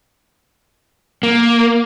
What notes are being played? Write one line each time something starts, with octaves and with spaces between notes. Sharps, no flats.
A#3